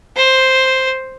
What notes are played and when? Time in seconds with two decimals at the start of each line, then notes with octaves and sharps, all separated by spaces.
0.17 C5